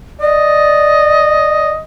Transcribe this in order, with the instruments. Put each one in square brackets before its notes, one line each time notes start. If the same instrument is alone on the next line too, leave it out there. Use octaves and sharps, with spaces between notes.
[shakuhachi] D5 [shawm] D#5